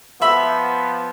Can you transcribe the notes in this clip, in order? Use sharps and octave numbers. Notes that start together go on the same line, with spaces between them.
F3 B3 E5 B5